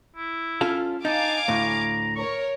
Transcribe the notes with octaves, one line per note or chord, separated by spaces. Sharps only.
E4
C#4 F4 A4
D#4 F5 G#5 A5 D6
D2 A2 A#5
A#4 C#5 C#6